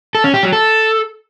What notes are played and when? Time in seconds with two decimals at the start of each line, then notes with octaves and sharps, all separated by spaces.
0.15 A4
0.24 C#4
0.34 G4
0.43 F#3
0.53 A4